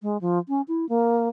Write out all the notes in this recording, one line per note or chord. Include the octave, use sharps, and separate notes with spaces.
G#3
F3
C#4
E4
A#3